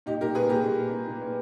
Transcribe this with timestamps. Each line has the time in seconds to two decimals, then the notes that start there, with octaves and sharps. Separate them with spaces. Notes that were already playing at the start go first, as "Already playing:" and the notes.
0.06 A#2 D#4 G4
0.21 A#2 G4 A#4
0.35 A#2 G#4 B4
0.49 A#2 G4 A#4
0.63 A#2
0.79 A#2
0.92 A#2
1.07 A#2
1.22 A#2